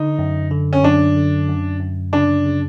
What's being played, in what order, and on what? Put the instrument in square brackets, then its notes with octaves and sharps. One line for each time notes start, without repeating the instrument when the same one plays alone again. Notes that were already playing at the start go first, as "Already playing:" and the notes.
Already playing: [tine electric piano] D3 [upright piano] D#4
[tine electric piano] F#2
D3
[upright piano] C#4
[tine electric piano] F#2 [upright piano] D4
[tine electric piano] D3
F#2
F#2
[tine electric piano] C#3 [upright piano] D4
[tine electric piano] C#3